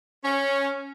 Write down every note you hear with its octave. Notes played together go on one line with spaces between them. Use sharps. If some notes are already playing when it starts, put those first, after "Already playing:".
C#4